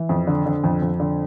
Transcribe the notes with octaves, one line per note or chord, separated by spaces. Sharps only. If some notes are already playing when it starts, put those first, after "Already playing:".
Already playing: E3
F2
D3
D3
F2
F2
D3